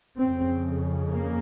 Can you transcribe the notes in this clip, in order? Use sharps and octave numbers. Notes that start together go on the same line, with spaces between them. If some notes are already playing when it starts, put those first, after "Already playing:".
F2 C#3 C4
A#3